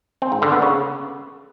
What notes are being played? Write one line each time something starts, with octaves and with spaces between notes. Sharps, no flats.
C4
G#2
D3
B3
C#3